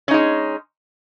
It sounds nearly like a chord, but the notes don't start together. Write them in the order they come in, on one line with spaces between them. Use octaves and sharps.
C#4 D#4 G#3